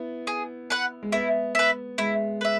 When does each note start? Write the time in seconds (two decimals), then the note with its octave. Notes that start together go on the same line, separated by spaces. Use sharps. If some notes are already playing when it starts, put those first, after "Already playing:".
Already playing: B3 E4
0.27 G#4
0.70 B4 F#5
1.03 G#3
1.12 B3 E4
1.55 B4 E5
1.98 G#3 E4
2.41 B4 E5